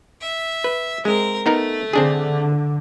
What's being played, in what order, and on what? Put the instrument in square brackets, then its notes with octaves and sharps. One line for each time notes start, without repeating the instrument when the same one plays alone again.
[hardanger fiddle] E5
[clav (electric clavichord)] B4
[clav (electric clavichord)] G#3 [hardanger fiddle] C4 A#4
[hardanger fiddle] A3 [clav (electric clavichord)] B3 D#4 A#4
[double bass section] D3 [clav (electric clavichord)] C4 D4 G#4